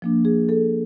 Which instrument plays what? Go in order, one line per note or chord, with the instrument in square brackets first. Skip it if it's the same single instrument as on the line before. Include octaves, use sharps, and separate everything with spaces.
[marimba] F3 A#3 D4
G#4
A4